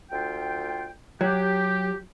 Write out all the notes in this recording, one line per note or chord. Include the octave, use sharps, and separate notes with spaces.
D2 F4 G5
F#3 G4